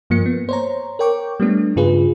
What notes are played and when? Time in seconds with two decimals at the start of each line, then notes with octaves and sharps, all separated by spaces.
0.10 G2 F3 A#3 C#7
0.26 B3
0.49 C5 C#5 A#5
0.99 A#4 C#5 G5 C#6 D6
1.40 G3 A3 B3 D4
1.76 G2 C#3 F4 G#4 B4